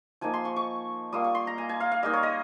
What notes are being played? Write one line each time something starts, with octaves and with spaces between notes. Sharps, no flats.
F3 A#3 D#4 G#5
C6
C#6
C#6
G3 A#3 F4 D#6
C#6
C6
A#5
G#5
G#5
F5
F5
G3 A#3 D#4 D#5
C#5
D#5